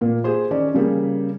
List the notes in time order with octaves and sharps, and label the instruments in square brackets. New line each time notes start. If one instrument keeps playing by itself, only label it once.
[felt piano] A#2 A#3
G4 G#4 C5
D#3 C#4 D5
C#3 G3 A#3 G4 G#4